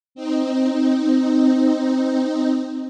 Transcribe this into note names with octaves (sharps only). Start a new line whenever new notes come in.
C4 D#4